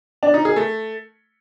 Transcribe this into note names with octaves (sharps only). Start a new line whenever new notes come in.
D4
D#4
G#4
A3